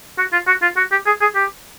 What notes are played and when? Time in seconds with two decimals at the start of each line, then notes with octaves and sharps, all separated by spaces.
0.18 F#4
0.33 F4
0.47 F#4
0.62 F4
0.77 F#4
0.92 G4
1.06 G#4
1.21 G#4
1.35 G4